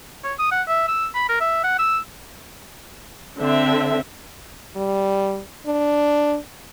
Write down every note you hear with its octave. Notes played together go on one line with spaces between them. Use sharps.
C#5
D#6
F#5
E5
E6
B5
A#4
E5
F#5
E6
D3 C4 E5
G3
D4